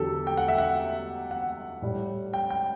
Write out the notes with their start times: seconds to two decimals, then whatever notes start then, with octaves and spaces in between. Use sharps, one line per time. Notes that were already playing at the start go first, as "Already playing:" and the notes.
Already playing: E2 D3 F#3 G4 A4
0.27 G5
0.37 F#5
0.48 E5
0.58 F#5
1.31 F#5
1.82 A2 G3
2.33 G5
2.50 G5